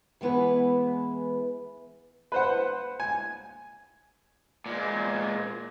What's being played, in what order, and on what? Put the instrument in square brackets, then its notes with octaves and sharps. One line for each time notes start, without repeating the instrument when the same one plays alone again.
[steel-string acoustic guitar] E3 G#3 B3 E4 B4
[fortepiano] B4 C5 F#5
G#5
[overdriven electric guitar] A#2 G#3